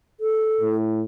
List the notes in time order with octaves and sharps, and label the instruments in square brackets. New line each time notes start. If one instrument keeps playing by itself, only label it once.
[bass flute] A4
[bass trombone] A2